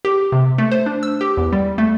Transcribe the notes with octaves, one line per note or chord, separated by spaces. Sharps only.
G4
C3
A3
C5
D4
E6
G4
E2
G3
A3